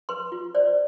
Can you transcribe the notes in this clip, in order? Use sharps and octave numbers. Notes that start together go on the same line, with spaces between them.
B4 C6
F4
C5 D5